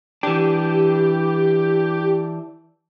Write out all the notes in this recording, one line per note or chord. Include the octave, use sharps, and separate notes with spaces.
E3 D4 G4